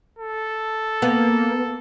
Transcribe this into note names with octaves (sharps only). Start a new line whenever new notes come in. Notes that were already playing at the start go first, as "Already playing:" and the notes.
A4
A#3 B3